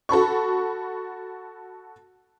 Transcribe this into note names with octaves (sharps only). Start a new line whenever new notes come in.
F#4 A4 B5 C#6